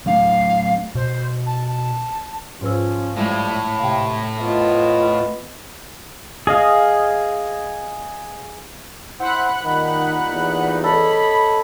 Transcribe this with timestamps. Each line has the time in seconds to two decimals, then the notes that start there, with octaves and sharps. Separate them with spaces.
0.06 F#3 A3 D4 F5
0.95 B2 C5
1.46 A5
1.67 A5
2.61 G#2 F3 C#4 B4 E6
3.16 A2 G3 G#3
3.80 C3 F5 G5
4.40 F2 B3 F4 D#5
6.47 G#4 D#5 F5
9.20 E4 C5 F#5 B5 F#6
9.64 A#2 D#3 G3 D#4
10.32 E2
10.84 A4 C#5 D#5 B5